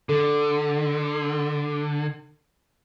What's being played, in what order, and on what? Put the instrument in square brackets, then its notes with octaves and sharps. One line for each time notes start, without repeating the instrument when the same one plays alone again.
[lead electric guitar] D3 [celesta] A4